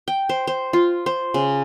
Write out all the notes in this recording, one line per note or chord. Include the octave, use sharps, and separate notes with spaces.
G5
C5
C5
F4
C5
C#3